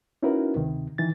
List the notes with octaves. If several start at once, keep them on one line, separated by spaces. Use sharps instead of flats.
C#4 D#4 E4 F#4 A#4 B4
D2 C3 D#3
D#3 E3 D#4 A6